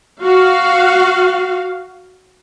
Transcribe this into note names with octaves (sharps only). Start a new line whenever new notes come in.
F#4 F5